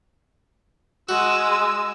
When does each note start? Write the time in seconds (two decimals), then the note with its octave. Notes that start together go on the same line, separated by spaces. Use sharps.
1.09 G#3 F#4 E6